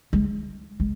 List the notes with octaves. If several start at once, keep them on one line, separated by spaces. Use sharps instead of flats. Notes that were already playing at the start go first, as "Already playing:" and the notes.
G#3
G#3